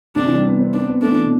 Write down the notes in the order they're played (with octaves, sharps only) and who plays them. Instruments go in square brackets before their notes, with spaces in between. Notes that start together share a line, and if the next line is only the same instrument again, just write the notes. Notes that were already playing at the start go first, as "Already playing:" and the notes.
[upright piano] C3 [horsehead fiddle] D4
[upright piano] E3
G3
B3
C4
[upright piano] C4 [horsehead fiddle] D4
[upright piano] B3
[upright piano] A3 [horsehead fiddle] D4
[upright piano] E3
B2